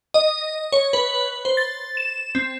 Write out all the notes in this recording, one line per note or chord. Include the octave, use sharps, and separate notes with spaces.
D#5
C#5
B4
C5
A6
E7
C4